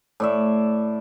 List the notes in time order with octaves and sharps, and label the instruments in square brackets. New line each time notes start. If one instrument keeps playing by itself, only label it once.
[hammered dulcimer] A2 D5 E5